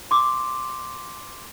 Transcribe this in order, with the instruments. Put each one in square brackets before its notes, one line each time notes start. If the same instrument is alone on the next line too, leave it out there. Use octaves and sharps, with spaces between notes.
[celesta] C6 D6